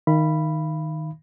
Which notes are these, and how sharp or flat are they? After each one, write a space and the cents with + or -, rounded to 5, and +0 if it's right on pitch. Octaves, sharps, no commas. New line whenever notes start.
D#3 +0 F5 -40 B5 +0